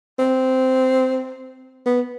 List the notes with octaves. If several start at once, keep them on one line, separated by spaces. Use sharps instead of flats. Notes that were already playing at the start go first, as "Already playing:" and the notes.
C4
B3